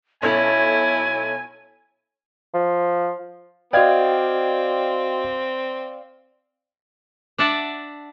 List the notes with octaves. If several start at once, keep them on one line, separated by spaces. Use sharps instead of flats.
B1 C#4 E4 A4 C#5 G#5
F3
C4 F#4 D5 D#5 F5 G5 G#6
D4 D5 E5 F#5 A5